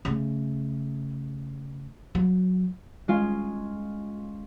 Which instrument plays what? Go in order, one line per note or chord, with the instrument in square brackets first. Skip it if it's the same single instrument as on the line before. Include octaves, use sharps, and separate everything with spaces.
[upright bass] C#3 A3
F#3
[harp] G#3 C#4 F4